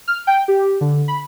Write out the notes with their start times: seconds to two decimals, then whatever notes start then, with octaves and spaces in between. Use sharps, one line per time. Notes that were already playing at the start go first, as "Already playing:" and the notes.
0.08 F6
0.27 G5
0.48 G4
0.81 D3
1.08 B5